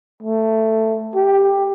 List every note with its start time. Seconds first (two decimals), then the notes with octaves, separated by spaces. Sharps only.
0.23 A3
1.16 G4